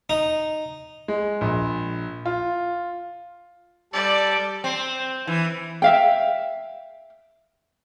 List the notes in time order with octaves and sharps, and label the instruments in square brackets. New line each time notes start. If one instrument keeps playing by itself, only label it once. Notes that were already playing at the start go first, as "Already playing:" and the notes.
[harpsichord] D#4
[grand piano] G#3
A#1
F4
[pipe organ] G3 A4 [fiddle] D5
[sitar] C4
E3
[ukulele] E5 F5 G5